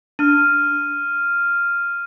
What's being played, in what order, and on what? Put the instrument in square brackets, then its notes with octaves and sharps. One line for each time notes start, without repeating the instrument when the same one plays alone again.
[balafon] D4 [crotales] F6 D#7